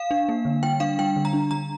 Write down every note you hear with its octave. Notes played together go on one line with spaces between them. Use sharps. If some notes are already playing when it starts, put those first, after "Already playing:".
Already playing: F5
D4
A#3
D3
G3 G5
D4 F5
G3 G5
D3
A#5
D4
D3 A#5